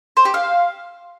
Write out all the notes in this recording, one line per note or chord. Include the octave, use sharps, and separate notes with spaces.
C5
G4
F5